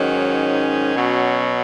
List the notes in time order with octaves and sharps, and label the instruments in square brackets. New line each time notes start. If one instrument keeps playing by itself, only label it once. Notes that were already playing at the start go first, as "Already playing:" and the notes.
Already playing: [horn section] G#2 D#3 F#3 C#4
B2 F#3